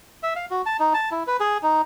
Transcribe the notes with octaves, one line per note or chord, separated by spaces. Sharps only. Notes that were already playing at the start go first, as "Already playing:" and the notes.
E5
F5
F#4
A5
D#4
A5
E4
B4
G#4
D#4